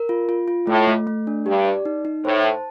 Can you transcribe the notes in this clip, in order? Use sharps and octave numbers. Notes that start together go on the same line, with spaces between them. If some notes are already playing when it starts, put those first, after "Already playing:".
Already playing: A#4
F4
F4
F4
A2 A3
A3
A3
D4
G2 G4
D5
D#4
D#4
A2 C5
A5